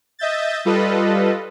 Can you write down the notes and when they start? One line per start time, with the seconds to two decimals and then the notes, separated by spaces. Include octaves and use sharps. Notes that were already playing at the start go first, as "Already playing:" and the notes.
0.19 D#5 E5 G6 A6
0.65 G3 F4 A4 B4 D#5